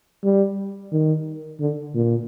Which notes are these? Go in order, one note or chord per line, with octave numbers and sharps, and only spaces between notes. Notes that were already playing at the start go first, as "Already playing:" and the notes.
G3
D#3
D3
A#2